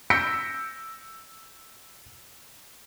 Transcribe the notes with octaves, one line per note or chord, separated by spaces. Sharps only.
E6 G6 A#6 B6 C#7 D7